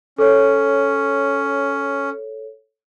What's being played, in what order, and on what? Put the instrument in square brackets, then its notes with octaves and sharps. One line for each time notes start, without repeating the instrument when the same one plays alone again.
[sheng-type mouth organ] C#4 [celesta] A4 C#5